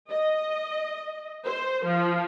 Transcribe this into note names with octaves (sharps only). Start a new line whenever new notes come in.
D#5
C5
F3